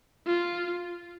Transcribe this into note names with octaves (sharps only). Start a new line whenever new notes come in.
F4